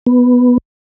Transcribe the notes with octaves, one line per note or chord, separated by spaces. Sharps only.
B3